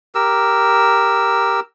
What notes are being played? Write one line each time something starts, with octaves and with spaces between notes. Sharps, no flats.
G4 A#4 E6